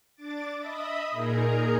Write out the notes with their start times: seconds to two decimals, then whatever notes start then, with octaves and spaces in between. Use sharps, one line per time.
0.16 D4 D6 A6
0.57 D#5 E5 B5 D#6
1.11 A#2 D#4 G#4 A#4 A#5